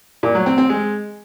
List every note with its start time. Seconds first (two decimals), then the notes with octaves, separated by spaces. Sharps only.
0.23 A#2
0.35 F#3
0.46 C4
0.58 C4
0.69 G#3